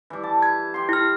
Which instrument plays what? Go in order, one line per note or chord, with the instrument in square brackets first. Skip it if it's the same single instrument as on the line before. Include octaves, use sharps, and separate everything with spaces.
[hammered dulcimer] E3 G3
A5
[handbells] G#6
[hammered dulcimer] G4 C6
[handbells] E4 F6